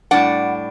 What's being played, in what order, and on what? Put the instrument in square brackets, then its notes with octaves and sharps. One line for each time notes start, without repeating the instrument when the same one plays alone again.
[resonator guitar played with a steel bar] A2 G3 D4 D5 F#5